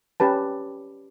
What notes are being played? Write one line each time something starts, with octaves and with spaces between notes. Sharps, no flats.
C#4 G4 B4 A5